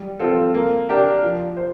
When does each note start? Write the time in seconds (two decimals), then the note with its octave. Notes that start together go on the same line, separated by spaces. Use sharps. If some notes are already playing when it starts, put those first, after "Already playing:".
Already playing: G3
0.19 C4 F4 A4
0.54 A#3
0.89 D4 G4 A#4
1.23 F3
1.57 C5